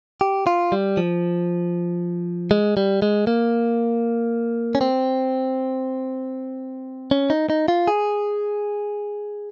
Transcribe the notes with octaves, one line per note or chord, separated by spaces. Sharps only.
G4
F4
G3
F3
G#3
G3
G#3
A#3
C#4
C4
C#4
D#4
D#4
F4
G#4